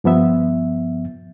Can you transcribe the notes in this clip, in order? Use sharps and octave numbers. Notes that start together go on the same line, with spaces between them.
G2 F3 B3 E5